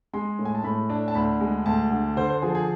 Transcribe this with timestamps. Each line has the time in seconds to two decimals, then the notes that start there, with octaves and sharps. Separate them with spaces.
0.13 G#3 C6
0.39 A2
0.45 G#5
0.55 A5
0.64 A2 B5
0.90 D4
1.08 A5
1.15 D2 B5
1.40 G#3
1.66 D2 A5
1.91 D3
2.16 D3 C5
2.30 C5
2.42 F3 G#4
2.55 G#4